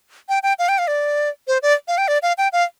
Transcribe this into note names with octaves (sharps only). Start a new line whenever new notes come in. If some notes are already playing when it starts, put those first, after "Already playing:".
G5
G5
F5
G5
F5
D5
C5
D5
F5
G5
D5
F5
G5
F5